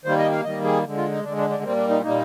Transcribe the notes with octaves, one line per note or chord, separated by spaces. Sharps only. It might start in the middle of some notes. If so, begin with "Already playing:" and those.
D#3 G3 A#3 C5
D#5
F5
D#3 G3 A#3 D#5
G#4
D3 G#3
F4
D#4
D3 G#3 D4
D4
D4
A#2 G3 A#3 C4
D4
D#4
A#2 G3 A#3 D#4